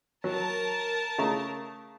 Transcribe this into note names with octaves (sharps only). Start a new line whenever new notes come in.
F#3 A#4 A5
C#3 A3 A#5